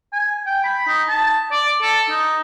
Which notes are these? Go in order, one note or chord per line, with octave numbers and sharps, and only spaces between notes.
G#5
G5
B5
D#4
A5
D5
A4
D#4